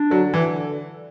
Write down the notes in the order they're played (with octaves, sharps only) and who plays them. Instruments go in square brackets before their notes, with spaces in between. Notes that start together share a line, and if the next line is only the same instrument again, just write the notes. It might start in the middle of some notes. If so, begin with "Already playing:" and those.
Already playing: [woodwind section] D4
[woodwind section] D3 [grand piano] F#3
[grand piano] E3